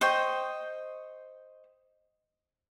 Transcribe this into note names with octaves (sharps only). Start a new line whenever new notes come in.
C5 D#5 G5 C#6